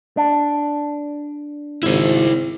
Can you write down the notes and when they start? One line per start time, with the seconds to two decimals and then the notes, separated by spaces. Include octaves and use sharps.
0.17 D4
1.83 G#1 E4 C5